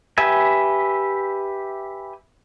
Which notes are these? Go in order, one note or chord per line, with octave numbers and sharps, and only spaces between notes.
G4 B4 E5 G#5